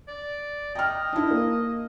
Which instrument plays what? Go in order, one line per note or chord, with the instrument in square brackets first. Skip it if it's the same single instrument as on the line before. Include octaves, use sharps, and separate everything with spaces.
[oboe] D5
[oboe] D#5 [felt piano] G5 F6
[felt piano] D4 E4
A#3